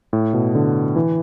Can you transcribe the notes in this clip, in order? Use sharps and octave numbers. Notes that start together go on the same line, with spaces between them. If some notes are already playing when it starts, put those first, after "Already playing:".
A2
B2
D3
E3